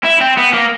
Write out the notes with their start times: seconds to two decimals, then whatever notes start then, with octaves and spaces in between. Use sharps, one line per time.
0.05 E4
0.21 C4
0.37 B3
0.53 A#3